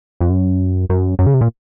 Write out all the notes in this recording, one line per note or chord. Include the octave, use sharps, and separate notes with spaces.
F2
F#2
F#2
F#2
C#3
C3
A#2